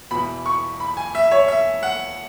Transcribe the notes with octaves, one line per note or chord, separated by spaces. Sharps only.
E1 E2 B2 B5
C#6
B5
G#5
E5
C#5
E5
F#5